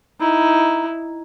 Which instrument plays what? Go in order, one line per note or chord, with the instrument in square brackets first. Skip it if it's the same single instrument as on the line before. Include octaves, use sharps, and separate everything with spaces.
[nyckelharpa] D#4 E4